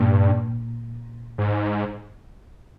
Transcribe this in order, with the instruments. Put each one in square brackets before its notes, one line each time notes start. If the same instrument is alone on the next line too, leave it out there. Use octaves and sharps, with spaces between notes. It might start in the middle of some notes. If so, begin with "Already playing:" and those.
Already playing: [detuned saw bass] G2 [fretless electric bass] A#2
[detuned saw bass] G#2